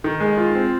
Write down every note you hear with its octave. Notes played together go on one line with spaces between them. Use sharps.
D#3
G#3
F4
C4